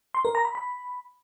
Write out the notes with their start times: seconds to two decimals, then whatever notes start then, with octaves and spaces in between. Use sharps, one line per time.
0.14 C6
0.25 A#4
0.35 A#5
0.45 B5
0.55 B5